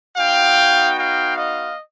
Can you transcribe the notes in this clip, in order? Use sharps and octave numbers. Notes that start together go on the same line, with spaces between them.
B3 D#4 F#4 F5 G5
F5 G5
D#5 F5